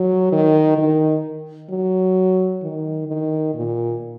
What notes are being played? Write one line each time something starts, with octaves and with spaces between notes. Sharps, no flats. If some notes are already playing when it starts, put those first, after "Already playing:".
Already playing: F#3
D#3
D#3
F#3
D#3
D#3
A#2